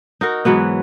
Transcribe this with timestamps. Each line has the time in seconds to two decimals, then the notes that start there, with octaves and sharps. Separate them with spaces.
0.21 D#4 F#4 A#4
0.45 G#2 E3 F#3 B3